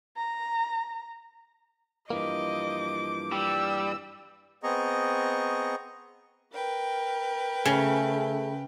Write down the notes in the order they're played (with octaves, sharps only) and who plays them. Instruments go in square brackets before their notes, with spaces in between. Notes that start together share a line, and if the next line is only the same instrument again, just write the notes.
[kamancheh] A#5
[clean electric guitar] G2 E3 A#3 [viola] F3 D6 [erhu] D#5
[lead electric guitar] G3 [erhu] E6
[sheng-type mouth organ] B3 C4 G#4 D#5 A#5 C#6
[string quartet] A#4 B4 G5
[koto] C#3 [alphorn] A3